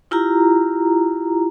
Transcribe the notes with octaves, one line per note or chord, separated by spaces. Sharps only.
E4 F4 G4 A#5